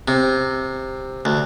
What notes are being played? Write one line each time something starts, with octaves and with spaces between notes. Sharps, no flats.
C3
D2